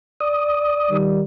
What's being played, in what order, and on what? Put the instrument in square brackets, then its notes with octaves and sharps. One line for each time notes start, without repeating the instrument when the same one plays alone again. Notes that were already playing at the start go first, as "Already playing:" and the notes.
[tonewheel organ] D5 D#6
[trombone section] D#3 G3